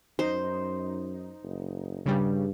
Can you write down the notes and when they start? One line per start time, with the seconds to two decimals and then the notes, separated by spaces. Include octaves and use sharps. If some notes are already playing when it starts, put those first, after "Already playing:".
0.19 F#2 D#4 C5
1.43 F#1
2.06 G2 C#3 G3